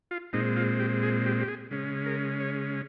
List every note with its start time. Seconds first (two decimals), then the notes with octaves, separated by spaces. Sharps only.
0.11 F4
0.33 A#2 G#3 C4 D#4
0.56 F4
0.80 G4
1.03 G#4
1.26 G4
1.41 G4
1.48 G#4
1.71 C#3 G#3 C#4
2.06 A#4
2.40 C#5